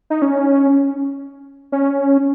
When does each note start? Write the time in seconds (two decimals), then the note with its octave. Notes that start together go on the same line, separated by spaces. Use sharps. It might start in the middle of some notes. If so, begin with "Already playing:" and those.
0.10 D#4
0.22 C#4
1.72 C#4